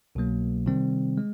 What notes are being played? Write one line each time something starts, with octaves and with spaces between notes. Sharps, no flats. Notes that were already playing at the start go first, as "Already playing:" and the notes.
C2 B2 F#3 A#3
C3 D#3 G3 C4
G#3